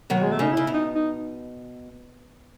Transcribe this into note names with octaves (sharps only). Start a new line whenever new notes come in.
B2 D#3 F#3
G#3
A3
C#3 D#4
C#3 E4
B2
D#4
D#4